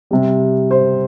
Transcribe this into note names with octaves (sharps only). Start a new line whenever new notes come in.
C3 G3
C5